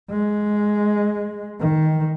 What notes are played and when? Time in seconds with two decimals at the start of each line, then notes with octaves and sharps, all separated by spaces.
0.10 G#3
1.60 D#3